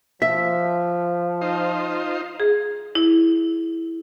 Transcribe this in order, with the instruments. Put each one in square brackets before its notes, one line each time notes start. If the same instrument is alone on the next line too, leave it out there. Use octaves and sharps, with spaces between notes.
[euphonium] F3 [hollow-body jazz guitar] E5
[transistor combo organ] D#4 F4 C5
[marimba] G#4
E4